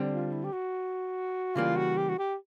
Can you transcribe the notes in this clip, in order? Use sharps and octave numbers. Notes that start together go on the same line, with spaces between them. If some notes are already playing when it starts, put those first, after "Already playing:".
Already playing: D3 G3 C4
F4
E4
G4
F#4
C#3 E3 G3 A#3 F4
F#4
G4
F#4
G4